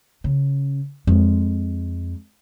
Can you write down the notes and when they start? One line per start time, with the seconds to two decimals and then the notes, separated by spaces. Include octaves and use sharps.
0.24 C#3
1.07 F2 G#3